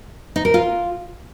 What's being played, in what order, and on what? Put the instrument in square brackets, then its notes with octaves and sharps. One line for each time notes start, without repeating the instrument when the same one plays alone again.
[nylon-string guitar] D#4
A#4
F4